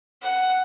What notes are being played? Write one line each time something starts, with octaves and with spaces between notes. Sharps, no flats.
F#5